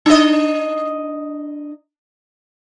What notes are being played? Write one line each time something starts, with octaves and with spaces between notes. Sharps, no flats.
D4 D#5